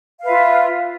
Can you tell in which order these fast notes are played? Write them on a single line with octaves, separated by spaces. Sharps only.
F5 B4 E5 F4